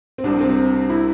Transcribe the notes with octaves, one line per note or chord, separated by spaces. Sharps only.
C4
C2 C3 G3 D4
C4
E4